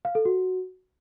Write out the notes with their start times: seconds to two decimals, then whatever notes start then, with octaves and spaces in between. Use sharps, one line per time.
0.05 F5
0.15 A4
0.25 F#4